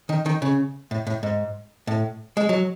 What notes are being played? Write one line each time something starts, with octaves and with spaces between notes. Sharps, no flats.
D#3
D#3
C#3
A2
A2
G#2
A2
G#3
F#3